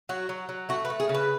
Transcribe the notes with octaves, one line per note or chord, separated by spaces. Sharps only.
F#3 F#4
F#3
F#3
A3 F#4
B4
A3
G#4
C#3
B4